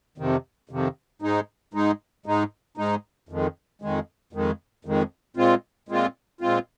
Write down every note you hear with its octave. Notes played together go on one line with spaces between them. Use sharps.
F2 C3 D#3
F2 C3 D#3
G#2 G#3 D#4
G#2 G#3 D#4
G#2 G#3 D#4
G#2 G#3 D#4
F2 D#3 G#3
F2 D#3 G#3
F2 D#3 G#3
F2 D#3 G#3
A#2 G#3 C4 F4
A#2 G#3 C4 F4
A#2 G#3 C4 F4